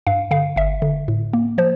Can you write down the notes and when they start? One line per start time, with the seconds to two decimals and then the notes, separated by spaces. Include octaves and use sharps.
0.07 G2 F5
0.31 D3 F5
0.56 G1 E5
0.82 D3
1.08 A2
1.33 A#3
1.58 F3 C5